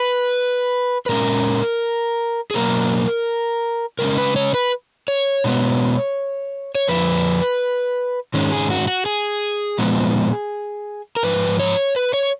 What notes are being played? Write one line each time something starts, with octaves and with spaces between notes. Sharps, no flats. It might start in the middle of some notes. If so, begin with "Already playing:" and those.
Already playing: B4
B4
A#2 G#3 C#4 A#4
G#4
B2 F#3 A#3 A#4
C#3 G#3 C#4 A#4
B4
C#5
B4
C#5
B2 G#3 B3
C#5
F2 F3 B4
G#2 D#3 G#3 C#4
G#4
F#4
F#4
G#4
A#2 F3 G#3 B3
A#4
G#2 F3 B4
C#5
B4
C#5